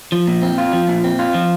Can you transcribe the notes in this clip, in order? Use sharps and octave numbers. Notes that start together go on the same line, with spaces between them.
F3
A#2
C4
F4
F3
A#2
C4
F4
F3